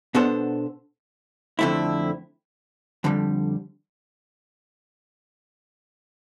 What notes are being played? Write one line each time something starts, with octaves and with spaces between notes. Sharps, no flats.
B2 B3 D4 A4 C5
F2 D3 A3 C4 E4
F2 D3 G3